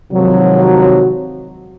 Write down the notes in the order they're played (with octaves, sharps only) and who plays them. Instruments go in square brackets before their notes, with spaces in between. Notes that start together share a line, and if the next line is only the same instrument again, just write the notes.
[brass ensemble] G#1 C3 D#3 F3 F#3